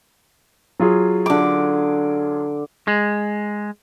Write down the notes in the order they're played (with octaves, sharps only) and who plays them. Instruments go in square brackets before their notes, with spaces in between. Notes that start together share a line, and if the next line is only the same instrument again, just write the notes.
[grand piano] F#3 F4 G#4
[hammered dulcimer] D3 D6
[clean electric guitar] G#3